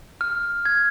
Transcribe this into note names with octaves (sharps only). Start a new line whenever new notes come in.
F6
G#6